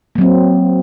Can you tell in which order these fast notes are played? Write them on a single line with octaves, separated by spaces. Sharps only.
A#3 F#3 C4